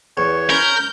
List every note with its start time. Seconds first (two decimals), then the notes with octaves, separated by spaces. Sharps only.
0.17 E2 C#5
0.50 C#4 A#4 B5 G6